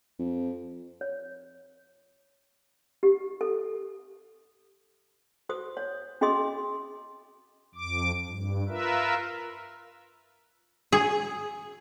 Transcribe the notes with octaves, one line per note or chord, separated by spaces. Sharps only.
F2
C#5
G4
A4
F#4 C5 D#6
C#5
C#4 F#4 G#4 D#5 C6 D#6
F2 D6
G2
F4 A#4 B4 E5
G#4